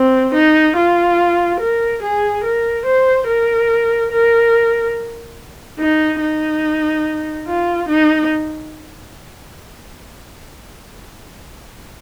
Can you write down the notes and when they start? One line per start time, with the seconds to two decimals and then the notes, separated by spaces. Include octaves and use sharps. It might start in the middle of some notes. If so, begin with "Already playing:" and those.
Already playing: C4
0.34 D#4
0.77 F4
1.60 A#4
2.03 G#4
2.44 A#4
2.86 C5
3.28 A#4
4.12 A#4
5.80 D#4
6.21 D#4
7.47 F4
7.89 D#4